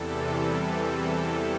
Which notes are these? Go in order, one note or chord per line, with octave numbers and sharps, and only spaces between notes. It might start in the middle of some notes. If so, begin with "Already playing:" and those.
Already playing: E2 C3 E3 G3 A4